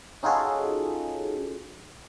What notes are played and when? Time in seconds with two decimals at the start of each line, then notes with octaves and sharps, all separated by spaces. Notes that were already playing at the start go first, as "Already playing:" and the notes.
0.23 C#4 D#4 F4 F#4 G#4 A4